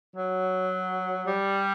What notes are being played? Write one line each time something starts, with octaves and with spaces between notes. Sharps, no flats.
F#3
G3